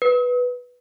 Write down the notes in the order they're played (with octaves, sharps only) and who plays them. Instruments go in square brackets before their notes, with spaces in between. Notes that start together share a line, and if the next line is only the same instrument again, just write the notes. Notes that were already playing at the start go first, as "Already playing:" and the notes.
[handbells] B4